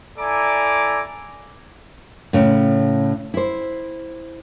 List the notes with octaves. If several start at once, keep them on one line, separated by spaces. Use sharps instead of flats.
E4 A4 D5 G#5 A#5 D6
A2 C#3
E4 C5